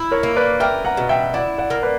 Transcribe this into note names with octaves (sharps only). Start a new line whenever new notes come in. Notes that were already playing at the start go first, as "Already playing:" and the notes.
Already playing: E4
A#4 C#5
A#3
B4 D5
A#4 E5 G5
F#5 A#5
B2
E5 G5
E4 D5 F#5
D5 F#5
A#3
B4 D5